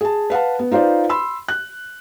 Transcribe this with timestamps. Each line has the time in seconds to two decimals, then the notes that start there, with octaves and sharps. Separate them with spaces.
0.01 G#4 A5
0.30 B4 F5 F#5 A5
0.59 B3
0.71 D#4 F4 B4 C5 D5
1.09 B5 C6 E6
1.48 F#6